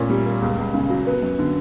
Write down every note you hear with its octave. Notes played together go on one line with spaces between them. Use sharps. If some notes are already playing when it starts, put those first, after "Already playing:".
Already playing: A#2 A3 C#4
G3
A#3
C#2
C#2
C#3
F#3
B3
F#2
D3